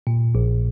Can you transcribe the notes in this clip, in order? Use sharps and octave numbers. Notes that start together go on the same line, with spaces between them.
A#2
A#1